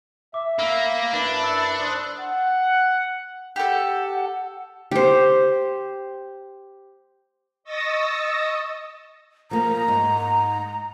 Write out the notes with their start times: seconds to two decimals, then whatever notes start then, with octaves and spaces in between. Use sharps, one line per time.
0.34 E5 D6
0.59 A#3 B5 E6 B6
1.13 F#2 D4 E4 B4
1.44 E6 A6 C#7
1.81 C5 D#6 F#6 E7 G7
2.20 F#5
3.56 G4 A4 F#5
4.91 G4 C5
7.64 D#5 C#6 D#6 E6 A6 A#6
9.51 F3 A#3 A#5
9.88 G#2